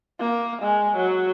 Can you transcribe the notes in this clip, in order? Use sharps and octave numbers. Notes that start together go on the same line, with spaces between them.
A#3
G#3
F#3